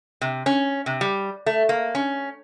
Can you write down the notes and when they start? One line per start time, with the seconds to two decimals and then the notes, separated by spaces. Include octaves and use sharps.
0.21 C3
0.46 C#4
0.86 C3
1.01 G3
1.46 A3
1.69 A#3
1.95 C#4